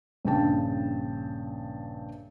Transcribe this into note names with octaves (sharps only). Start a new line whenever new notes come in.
A#1 G2 C#3 G5 A5